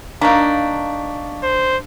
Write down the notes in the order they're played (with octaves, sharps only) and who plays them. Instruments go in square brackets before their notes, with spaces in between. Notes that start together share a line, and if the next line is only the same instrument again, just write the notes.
[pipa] A#3 D#4 [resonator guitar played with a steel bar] D4 [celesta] F5 C#6 B6
[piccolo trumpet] C5